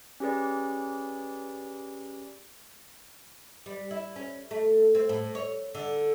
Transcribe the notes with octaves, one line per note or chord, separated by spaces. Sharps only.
C#4 G4 G#4 B4 D5
G3
E4
C#4
A3
C4
A2
C#5
D3